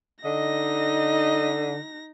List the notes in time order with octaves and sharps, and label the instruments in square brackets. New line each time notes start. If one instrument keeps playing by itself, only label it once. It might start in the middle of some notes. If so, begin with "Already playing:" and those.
[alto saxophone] D3 [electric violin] D#4 A#6 [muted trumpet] D#5